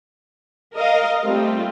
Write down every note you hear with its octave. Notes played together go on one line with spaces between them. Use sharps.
A#4 D#5 F5
G3 A3 C4 F4